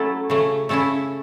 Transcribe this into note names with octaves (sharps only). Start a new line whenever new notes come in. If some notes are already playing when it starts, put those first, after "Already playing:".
Already playing: F#3 A3 C#4 E4 A4
C#3 A3 C#4
C#3 A3 C#4 E4 A4